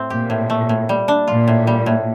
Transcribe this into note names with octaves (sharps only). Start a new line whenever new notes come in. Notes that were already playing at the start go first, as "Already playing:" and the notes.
Already playing: A2 A3 C4
A#2 G4
A2
A3
A2
G3
D4
A#2 F4
A2
G3
A2